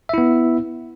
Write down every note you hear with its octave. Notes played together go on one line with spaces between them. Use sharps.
B3 E4 E5